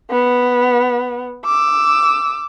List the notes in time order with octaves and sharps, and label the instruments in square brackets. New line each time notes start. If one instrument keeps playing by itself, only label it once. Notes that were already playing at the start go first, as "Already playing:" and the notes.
[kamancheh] B3
D6 E6